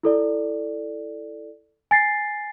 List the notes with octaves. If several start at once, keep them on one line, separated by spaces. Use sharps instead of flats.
E4 A4 D5
G#5 A6 C7